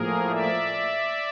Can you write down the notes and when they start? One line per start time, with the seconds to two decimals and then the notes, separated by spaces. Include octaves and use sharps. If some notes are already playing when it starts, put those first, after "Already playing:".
Already playing: A2 F3 A#3 G#4 A#4
0.29 D5 E5